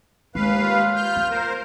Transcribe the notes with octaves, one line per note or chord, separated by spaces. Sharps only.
D#2 G#3 B4 F5
F4
F6 G6
B3
A#4 C5